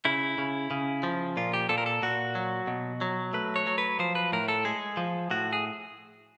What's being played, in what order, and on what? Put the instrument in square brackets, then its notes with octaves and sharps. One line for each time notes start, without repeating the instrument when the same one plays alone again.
[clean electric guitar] C#3 E4
C#3
C#3
F3
A#2 F4
G4
A#2 A4
A#4
A4
A#2 F#4
F#3
B2
F#3
A3 B4
C#5
F#3
B4
F3 C5
B4
A2 A#4
A4
G#3 G#4
F3
A2 F#4
G#4